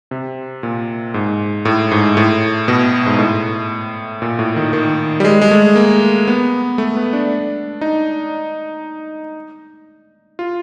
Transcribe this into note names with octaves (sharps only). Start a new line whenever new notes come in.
C3
A#2
G#2
A2
G#2
A2
B2
G#2
A2
A#2
A2
D#3
D#3
G3
G#3
G#3
A3
A#3
B3
A3
B3
D4
D#4
F4